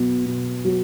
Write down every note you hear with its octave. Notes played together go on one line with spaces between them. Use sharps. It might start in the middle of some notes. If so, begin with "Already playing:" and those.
Already playing: B2 F#3 B3
B2
F#3